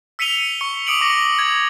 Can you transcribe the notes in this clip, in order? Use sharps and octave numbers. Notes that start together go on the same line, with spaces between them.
E6 B6 C#7 D#7 F7 G7
C#6 C#7
D6 D#6 C#7 D7 F7 F#7
C#6 D6 A#6
G#6